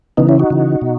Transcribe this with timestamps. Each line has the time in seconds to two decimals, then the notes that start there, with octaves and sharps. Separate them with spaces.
0.17 C#3 E3 B3 D#4
0.29 C#4 E4
0.39 D#4 F#4
0.50 C#3 E3
0.81 B2